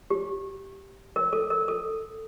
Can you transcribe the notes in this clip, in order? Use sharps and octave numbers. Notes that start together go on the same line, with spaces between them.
G4
A#4
A4
A#4
A4